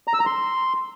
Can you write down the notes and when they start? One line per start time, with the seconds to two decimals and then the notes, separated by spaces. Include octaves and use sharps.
0.08 A#5
0.14 E6
0.20 A#5
0.26 C6